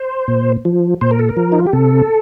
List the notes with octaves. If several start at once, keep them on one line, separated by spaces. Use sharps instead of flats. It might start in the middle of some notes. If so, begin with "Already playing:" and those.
Already playing: C5
A#2
F3
A#2 C5
A#4
A4
A#4
F3
D#4
F4
G4
C3 A4